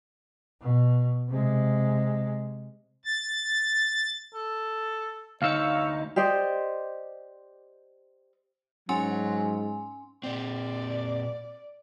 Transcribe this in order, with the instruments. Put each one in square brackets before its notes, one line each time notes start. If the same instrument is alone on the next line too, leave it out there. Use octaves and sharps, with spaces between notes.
[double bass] B2
C3 G#3
[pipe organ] A6
[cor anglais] A4
[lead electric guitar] D2 D#4 [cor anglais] C#5 [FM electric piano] F5 E6 C#7
[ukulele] G4 C5 D5 D#5
[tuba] G#2 [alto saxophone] F#3 [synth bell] C#4 G#5 C6
[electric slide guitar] A#2 C4 [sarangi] D5